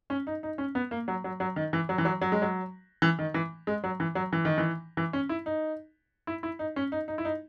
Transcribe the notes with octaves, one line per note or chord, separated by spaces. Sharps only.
C#4
D#4
D#4
C#4
B3
A#3
F#3
F#3
F#3
D#3
E3
F#3
E3
F#3
F#3
G#3
F#3
E3
D#3
E3
G#3
F#3
E3
F#3
E3
D#3
E3
E3
C#4
E4
D#4
E4
E4
D#4
C#4
D#4
D#4
E4
D#4